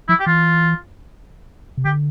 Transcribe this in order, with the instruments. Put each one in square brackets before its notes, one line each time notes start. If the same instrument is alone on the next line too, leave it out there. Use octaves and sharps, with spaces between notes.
[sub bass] F3 [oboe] E4
[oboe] G4
[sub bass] E3 [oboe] F4
[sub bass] C3
[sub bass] D3 [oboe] G4